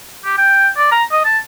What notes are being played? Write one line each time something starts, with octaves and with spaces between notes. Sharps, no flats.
G4
G5
D5
A#5
D#5
A5